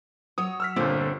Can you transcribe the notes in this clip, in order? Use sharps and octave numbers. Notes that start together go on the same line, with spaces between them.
F#3 C#5 D#6
E6 F6 B6
G1 A#2 D3 C4